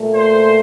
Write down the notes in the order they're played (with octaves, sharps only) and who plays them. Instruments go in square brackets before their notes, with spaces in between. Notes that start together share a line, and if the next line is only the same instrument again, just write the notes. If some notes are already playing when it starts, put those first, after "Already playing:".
Already playing: [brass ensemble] A#2 A3
C5